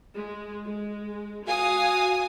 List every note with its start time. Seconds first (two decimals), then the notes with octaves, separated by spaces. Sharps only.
0.14 G#3
0.65 G#3
1.46 F#4 F5 G#5 D#6